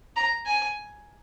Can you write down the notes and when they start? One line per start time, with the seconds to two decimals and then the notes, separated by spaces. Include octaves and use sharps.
0.16 A#5
0.46 G#5